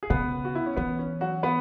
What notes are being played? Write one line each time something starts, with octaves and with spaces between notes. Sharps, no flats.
G#4
C#3 B3 B4
F#4
E4
C#4
E3 B3
C#4
F#3 F#4
B3 B4